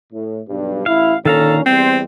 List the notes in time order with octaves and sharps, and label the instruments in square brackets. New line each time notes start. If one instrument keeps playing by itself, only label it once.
[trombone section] A2
B1 G2
[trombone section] A1 E4 [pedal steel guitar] F5
[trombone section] A#2 D3 C#4 [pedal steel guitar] D#3 F5 A#5 [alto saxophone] A4
[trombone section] E2 G3 [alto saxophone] C4 [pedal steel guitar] C5